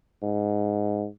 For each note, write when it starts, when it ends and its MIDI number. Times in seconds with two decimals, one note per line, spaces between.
0.23 1.06 44